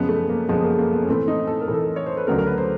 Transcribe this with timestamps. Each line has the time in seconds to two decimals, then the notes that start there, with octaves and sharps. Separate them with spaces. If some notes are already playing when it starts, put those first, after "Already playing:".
Already playing: F#2 C#3 F3 G#3 B3
0.09 A3
0.29 A#3
0.48 F#2 C#3 F3 G#3 B3
0.64 A#3
0.79 A#3
0.93 B3
1.03 C#4
1.08 A2 E3 A3 C4
1.28 D#4
1.47 A4
1.61 A#4
1.68 A2 E3 A3
1.74 A4
1.96 C#5
2.06 C5
2.17 B4
2.27 D2 C#3 F#3 A3 A#4
2.38 A#4
2.47 B4
2.58 C5